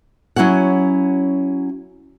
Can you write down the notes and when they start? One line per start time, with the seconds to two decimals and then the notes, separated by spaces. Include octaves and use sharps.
0.36 F#3 C#4 E4 F#4 F#5